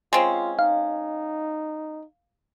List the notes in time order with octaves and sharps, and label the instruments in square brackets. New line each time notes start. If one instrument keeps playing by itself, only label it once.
[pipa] G#3 C4 C#4 [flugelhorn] F4
[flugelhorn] D#4 [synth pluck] F5